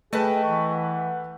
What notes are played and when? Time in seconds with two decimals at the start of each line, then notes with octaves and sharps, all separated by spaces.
0.13 A3 G#4 B4 D#5 G5 A5
0.43 E3 C#6
0.72 F#5